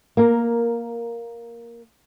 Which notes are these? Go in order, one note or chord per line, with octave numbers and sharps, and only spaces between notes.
A#3 A#4